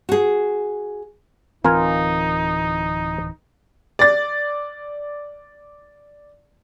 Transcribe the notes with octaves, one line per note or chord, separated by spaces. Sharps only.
F#4 G#4
D1 E3 C4 D#4 F4 A#4 G#5
D5 A6